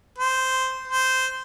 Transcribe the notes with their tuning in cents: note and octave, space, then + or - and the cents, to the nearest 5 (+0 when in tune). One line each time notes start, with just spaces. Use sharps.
C5 -10
C5 -10